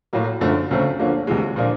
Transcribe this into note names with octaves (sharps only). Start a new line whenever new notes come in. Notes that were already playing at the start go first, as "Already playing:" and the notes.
A2 F#3 A#3
F#2 D3 F3 A3
D2 C#3 F#3 A3 C4
D3 F3 A#3 C#4
D2 C3 E3 G#3
A#2 F3 A#3 D4